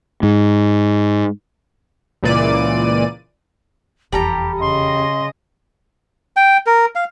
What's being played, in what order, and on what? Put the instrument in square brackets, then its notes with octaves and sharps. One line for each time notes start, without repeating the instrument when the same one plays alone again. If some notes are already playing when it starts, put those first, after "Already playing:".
[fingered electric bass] G#2
[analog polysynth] C#2 A#2 E3 D5 D#7
[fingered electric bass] F1 E2 [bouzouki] G3 A4 A#5 [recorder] G4
[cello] C#3 D#5 [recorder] C6
[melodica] G5
A#4
F5